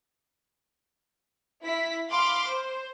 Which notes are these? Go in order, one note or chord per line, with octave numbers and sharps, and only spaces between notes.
E4 B6
F5 B5 C6 D6 F6
C5